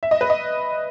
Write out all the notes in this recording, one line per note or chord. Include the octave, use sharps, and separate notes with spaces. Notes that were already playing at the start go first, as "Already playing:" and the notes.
E5
D#5
B4
D#5